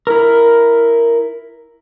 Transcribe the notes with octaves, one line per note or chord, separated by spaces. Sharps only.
E4 A#4